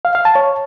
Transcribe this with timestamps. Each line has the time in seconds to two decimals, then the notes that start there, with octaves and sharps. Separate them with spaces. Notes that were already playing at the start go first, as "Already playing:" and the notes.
0.05 F5
0.15 F5
0.25 A5
0.35 C#5